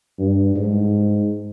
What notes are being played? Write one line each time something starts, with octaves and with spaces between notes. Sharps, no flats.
G2
G#2